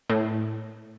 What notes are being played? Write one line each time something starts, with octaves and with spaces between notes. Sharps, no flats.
A2